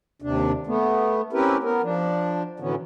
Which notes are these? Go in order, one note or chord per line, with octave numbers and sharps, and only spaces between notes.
D#2 C3 D4
A3 B3
C4 C#4 E4 G4 A#4 B4
B3 A#4
F3 D4
A2 D3 E3 F#3 B3 C#4